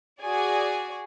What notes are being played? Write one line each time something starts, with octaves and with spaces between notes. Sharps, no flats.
F#4 G#4 D5 G#5